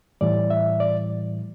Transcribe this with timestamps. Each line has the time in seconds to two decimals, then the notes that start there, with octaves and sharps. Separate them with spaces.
0.21 A2 E3 G3 D5
0.50 E5
0.80 D5